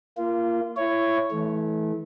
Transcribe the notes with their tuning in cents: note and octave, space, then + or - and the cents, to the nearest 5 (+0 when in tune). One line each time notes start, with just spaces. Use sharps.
A#3 +0 F4 -25
E4 +25 C#5 +0
E3 -25 A3 -30